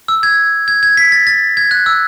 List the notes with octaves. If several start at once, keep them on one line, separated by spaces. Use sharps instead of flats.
E6
G#6
G#6
G#6
B6
A6
A6
G#6
F#6
E6